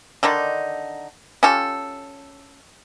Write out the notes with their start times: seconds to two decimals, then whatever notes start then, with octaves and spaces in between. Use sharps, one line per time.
0.23 D3 D#3 D4 D#4
1.43 C#4 F4 G4 A4